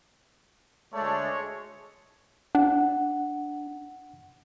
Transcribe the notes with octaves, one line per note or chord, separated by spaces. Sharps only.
D2 G#3 A3 D4 C#5 D5
D4 F#5